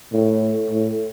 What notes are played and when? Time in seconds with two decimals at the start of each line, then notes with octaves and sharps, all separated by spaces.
0.13 A2
0.71 A2